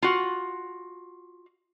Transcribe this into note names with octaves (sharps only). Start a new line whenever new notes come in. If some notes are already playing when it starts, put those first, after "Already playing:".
F4 F#4